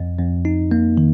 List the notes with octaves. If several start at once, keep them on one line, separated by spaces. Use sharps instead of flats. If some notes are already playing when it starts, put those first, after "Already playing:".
Already playing: F2
F2
D#4
A#3
D#3